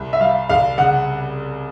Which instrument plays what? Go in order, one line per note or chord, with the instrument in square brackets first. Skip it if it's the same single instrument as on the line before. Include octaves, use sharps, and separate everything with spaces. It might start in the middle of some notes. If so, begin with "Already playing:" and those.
Already playing: [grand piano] C2
[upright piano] E5
[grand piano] G3 [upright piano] F5
[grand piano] C2 [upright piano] F5
[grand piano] C#3 [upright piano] F#5